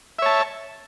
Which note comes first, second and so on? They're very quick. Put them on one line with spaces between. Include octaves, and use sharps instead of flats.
E5 C#5 A5